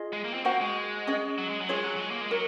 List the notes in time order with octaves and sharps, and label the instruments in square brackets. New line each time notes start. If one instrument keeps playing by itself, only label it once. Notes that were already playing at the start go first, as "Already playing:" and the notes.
Already playing: [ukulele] F4 G#4 D#5
[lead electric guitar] G#3
A#3
C4
[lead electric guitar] A#3 [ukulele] F#4 C5 F#5
[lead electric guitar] G#3
[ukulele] C#4 G#4 D#5
[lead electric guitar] F#3
G#3
F#3
[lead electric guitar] G#3 [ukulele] F4 G#4 C#5
[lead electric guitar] F#3
F#3
G#3
A#3
G#3
[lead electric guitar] F#3 [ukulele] A#4